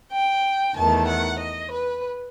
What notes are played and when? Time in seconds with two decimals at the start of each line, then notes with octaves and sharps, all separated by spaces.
0.12 G5
0.75 E2 D#3 A3 A5
1.06 F#5
1.38 D#5
1.70 B4